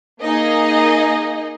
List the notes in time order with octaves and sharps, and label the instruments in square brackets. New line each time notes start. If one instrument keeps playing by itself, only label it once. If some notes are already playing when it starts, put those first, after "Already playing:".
[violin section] A#3 D#4 G#4 D#5